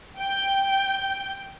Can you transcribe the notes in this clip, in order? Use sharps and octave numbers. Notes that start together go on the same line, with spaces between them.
G5